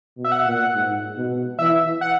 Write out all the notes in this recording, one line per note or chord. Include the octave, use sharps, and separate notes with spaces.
B2
E5
F#5
A#2
G#2
B2
E3 E5
F#5